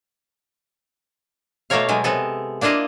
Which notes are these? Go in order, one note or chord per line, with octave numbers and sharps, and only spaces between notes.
B2 A3 A#3 A#4 C#5 F5
B2 F#3 G#3
C3 G#3 B3 A4
A#3 D4 E4 F4 D#5